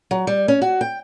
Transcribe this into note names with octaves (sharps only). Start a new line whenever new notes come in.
F#3
G3
C#4
F#4
G5